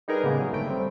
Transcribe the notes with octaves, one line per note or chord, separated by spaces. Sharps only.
G3 D#4 G#4 A#4 B4
A2 C#3 G3 G#3 A#3 B3
F#3
G1 A3 G5
G3 C4